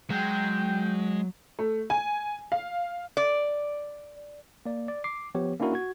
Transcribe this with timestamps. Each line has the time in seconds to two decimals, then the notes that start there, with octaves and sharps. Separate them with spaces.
0.10 F#3 G#3 G5 G6
1.59 A3
1.90 G#5
2.52 F5
3.17 D5
4.66 A#3 D5
4.88 D5
5.04 D6 C7
5.35 F3 B3 G4 C#5
5.60 A#3 C#4 D4 E4 F#4 A#4
5.73 F#4 G#6